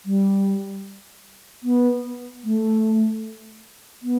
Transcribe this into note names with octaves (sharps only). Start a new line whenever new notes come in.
G3
B3
A3
B3